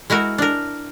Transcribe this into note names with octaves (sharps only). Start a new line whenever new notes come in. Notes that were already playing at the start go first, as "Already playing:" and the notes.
G#3 E4 F#4 A#4
D4 A#4